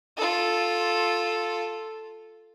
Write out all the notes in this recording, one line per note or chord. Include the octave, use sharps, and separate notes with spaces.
F4 A4